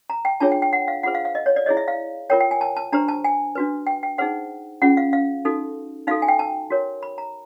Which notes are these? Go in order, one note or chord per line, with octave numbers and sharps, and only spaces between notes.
A#5
G5
D4 F4 G#4 C#5 A5
G5
G5
F#5
F5
F4 G#4 C5 F#5
F5
F5
D#5
C#5
D5
E4 G#4 C#5 D#5
E5
F5
F4 A#4 C#5 G5
G5
G#5
A5
A5
D4 G4 C5 A#5
A5
G#5
D4 F#4 B4
G5
G5
D#4 G#4 C5 F#5
C#4 F4 G#4 F#5
F5
F5
D#4 F#4 A4
D#4 F#4 A4 F5
G#5
G5
A5
F#4 A#4 C#5
B5
A#5